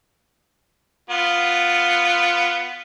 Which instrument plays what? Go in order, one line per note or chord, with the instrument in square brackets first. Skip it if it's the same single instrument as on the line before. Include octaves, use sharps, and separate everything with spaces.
[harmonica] B3 F4